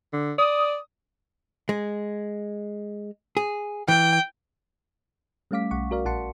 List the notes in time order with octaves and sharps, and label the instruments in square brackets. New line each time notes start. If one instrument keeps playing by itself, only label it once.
[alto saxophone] D3
[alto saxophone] D5 [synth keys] D#6
[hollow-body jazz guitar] G#3
G#4
[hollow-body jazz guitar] E3 [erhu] G5
[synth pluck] G3 A3 C#4 F5 D6 B6
B1 F#5 C#6
F#4 A#4 D5 F5
A#1 F#4 F#5 A5 C6 C#7